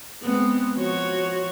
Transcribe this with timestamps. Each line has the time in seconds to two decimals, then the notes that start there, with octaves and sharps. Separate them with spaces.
0.23 G#3 B3 C4
0.75 F3 F#4 C#5